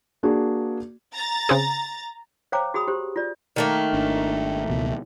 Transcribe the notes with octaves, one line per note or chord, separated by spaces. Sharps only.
A#3 D4 F#4 G#4
A#5 A6
C#3 C4 G#4
C5 C#5 F5 G5 A#5 D6
F#4 G#4 B5 D#6
G4 C5
F4 D5
D#3 A3 A#3
G#1 D4
C#2 B2 E3